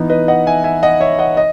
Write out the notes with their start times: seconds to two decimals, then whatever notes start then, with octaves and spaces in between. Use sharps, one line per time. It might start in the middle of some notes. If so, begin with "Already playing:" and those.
Already playing: E3 B3 D#4
0.10 B4 D#5
0.28 D#5 F#5
0.47 E5 G#5
0.64 E5 G#5
0.83 D#5 F#5
1.00 C#5 E5
1.19 D#5 F#5
1.37 D#5